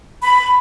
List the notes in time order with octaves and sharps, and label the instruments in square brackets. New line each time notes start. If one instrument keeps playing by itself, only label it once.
[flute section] B5